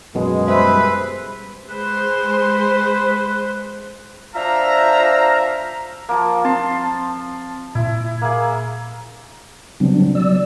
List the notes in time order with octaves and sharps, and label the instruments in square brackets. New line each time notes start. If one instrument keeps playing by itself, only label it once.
[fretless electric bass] F#2 B2 [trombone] G#3
[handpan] G3 C5 E5 [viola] B4
[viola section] G#3 C5 [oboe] B4
[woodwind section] D4 F4 C5 E5 F5 A#5
[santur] F3 A#3
[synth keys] C4 [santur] A5 C6
[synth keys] A#2 [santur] E4
[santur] A#3 G#4
[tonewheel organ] C#3 F#3 G3 B3 C4 D4
F#3 D5 E6